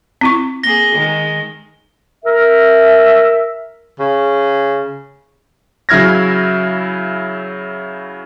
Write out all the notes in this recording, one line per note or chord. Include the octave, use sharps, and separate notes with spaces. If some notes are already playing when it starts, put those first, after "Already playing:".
C4 E4 C#6
A#3 G#4 A#6 G7
D#3 G#3
A#4 E5
C#3
C#3 F#3 E4 F6 G#6 A#6